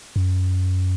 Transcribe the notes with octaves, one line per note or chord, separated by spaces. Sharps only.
F#2